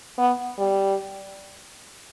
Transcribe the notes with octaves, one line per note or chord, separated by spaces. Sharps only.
B3
G3